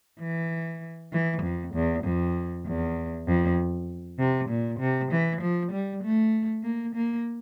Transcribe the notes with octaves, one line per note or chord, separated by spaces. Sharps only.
E3
E3
F2
E2
F2
E2
F2
C3
A#2
C3
E3
F3
G3
A3
A#3
A#3